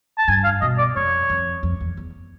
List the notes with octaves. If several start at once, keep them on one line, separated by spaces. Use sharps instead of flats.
A5
G2 G#5
F5
B2 D#5
D5
F2 C#5
F2
F2
E2
E2